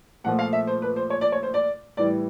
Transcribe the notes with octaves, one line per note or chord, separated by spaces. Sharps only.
A#2 F3 A3 F#5
F5
E5
C5
B4
C5
C#5
D5
C#5
C5
D5
A2 E3 G3 D5